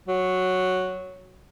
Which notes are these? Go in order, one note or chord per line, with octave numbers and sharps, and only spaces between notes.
F#3